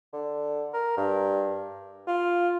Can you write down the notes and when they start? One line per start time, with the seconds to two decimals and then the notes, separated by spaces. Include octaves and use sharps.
0.13 D3
0.74 A#4
0.97 G2
2.07 F4